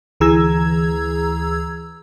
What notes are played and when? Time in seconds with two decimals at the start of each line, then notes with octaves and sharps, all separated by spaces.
0.20 D2 E3 G#4 A#5 E6 G#6